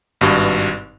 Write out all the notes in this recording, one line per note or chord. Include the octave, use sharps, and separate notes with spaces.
G#1 G2 B2